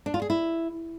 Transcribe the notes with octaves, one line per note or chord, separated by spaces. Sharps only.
D4
F4
G#4
E4